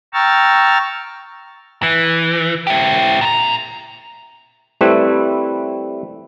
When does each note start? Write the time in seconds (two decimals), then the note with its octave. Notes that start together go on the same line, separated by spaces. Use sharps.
0.13 G5 A#5 C#6 E6 F6 A6
1.83 E3
2.67 E4 G4
3.21 A#2 A#5
4.81 G3 A3 C4 E4 B4